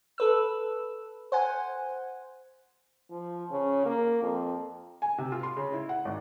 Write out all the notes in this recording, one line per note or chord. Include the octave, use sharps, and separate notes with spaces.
A4 B4 E6
C5 F#5 G#5
F3
C#3
A#3
F2
G#5
C3
F4
C6
C#3
E4
F#5
G#1